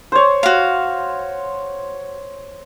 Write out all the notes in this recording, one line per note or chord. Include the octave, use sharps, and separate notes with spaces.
C5 C#5
F#4 F5